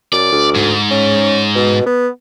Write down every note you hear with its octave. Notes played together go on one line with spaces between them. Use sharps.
F#2 D5
D2
G#2
C#4
B2
B3